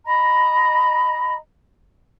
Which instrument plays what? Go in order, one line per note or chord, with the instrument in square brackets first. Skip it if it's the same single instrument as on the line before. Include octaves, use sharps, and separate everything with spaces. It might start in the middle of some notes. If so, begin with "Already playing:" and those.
[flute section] D#5 A#5 B5